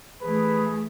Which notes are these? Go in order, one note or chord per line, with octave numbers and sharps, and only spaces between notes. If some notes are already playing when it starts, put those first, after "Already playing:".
E3 A3 G#4 B4